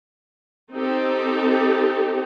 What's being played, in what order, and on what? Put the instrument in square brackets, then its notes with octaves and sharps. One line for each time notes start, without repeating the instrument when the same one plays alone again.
[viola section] C4 D#4 G4 A4